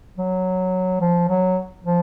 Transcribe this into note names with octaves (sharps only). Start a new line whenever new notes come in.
F#3
F3
F#3
F3